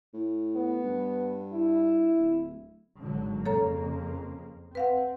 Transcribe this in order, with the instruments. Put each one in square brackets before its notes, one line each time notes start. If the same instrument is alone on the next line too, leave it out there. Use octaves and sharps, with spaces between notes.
[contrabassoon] A2
[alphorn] B3
[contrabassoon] G2
[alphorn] E4
[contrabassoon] D1
[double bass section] G#1 D3 F#3
[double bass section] F2 C#3 A#3 [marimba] A4 C#5 A#5
[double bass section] C4 [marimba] B4 F5 F#5